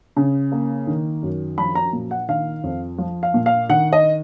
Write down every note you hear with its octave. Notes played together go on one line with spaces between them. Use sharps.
C#3
A#3
D#3
F#2
F3 B5
A#5
A#2
F#5
D#3 F5
F2
F3
F5
A#2
F5
D#3 F#5
D#5